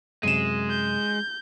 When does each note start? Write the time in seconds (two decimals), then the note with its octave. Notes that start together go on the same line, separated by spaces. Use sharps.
0.23 F#2 C3 G#3 D#7 E7
0.70 G6